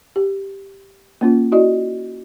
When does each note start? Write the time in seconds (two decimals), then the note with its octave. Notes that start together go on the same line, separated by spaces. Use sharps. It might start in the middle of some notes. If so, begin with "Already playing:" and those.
0.16 G4
1.21 A#3 C#4 F4
1.52 E4 F#4 D5 D#5